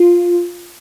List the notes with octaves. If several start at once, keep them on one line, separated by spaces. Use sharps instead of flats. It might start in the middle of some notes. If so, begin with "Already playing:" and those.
Already playing: F4